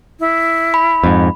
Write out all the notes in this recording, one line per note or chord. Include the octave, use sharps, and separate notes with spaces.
E4
B5
F2 G#2